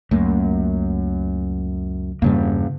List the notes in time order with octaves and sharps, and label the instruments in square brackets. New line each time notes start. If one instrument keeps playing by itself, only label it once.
[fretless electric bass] C#2 A3 A#3 [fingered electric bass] F#2
[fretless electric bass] E2 G2 G3 [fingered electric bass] C#3 A#3